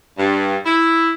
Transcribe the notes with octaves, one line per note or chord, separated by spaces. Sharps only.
G2
E4